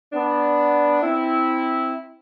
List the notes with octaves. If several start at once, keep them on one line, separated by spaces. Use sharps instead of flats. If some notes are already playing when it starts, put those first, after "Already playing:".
B3 D4
C4 E4